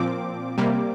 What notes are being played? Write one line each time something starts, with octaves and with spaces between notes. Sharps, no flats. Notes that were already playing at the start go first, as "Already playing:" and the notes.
Already playing: A#2 F3 C4 D6
C3 G3 A#3